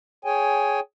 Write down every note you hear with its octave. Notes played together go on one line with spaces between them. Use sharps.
G#4 C#5 G5 G#5